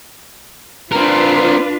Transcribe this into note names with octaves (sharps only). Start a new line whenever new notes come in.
C4 D4 F4 A#4 B4